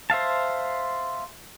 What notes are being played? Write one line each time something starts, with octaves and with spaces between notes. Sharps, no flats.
C5 E5 F5 A5